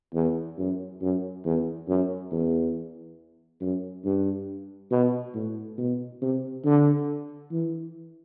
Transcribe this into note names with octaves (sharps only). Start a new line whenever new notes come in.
E2
F#2
F#2
E2
F#2
E2
F#2
G2
B2
A2
B2
C3
D3
E3